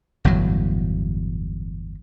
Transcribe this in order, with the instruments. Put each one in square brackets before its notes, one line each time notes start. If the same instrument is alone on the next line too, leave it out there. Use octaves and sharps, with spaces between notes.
[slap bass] G1 E2 A2 F#3